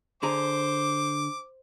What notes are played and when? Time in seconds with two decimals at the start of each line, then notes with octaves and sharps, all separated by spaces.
0.23 D3 G#4 C5 A#5 D6